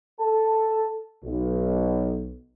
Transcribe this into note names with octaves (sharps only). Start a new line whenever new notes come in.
A4 A5
B1